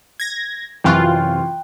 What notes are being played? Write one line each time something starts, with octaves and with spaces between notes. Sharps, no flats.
G#6 A#6
F#2 C3 E3 F4 G5 C6 C#6 F#6